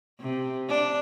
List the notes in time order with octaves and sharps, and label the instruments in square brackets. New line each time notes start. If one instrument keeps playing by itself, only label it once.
[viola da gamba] C3
D4